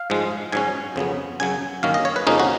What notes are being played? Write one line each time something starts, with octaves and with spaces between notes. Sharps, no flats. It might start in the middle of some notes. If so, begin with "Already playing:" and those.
Already playing: F5
G#2 F3 G#3
G#2 F#3 C#4 G#5
F2 C#3 F#3 B3
F#2 C#3 F#3 G#5
F#2 D#3 A#3 C#4 F5
D#5
C#5
B4
F2 C#3 F3 A#3 C#4 D#4
F#4